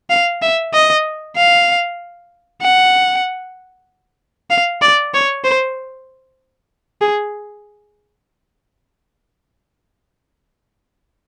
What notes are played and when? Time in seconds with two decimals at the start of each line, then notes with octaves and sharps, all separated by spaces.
0.10 F5
0.42 E5
0.74 D#5
1.37 F5
2.62 F#5
4.51 F5
4.82 D5
5.14 C#5
5.45 C5
7.02 G#4